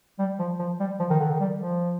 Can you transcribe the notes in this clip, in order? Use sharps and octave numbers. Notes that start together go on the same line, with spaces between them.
G3
F3
F3
G3
F3
D#3
D3
D#3
G3
F3